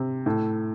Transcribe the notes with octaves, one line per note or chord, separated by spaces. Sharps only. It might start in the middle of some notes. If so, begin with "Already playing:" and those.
Already playing: C3
A2